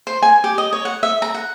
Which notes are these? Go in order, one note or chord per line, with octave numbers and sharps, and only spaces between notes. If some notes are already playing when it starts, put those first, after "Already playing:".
C5
G#5
G4
D#5
C#5
F#5
E5
A#5
F#5